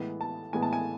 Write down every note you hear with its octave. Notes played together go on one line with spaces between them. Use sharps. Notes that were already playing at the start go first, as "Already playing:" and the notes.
Already playing: A2 E3 G#3 B3
A5
A2 E3 G#3 B3 G#5
A5
G#5